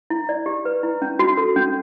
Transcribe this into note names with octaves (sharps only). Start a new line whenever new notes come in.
E4
D5
G4
B4
E4
C#4
F#4
A4
C#4